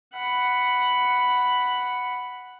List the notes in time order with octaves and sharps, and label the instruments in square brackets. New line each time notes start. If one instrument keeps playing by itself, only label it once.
[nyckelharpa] F#5 B5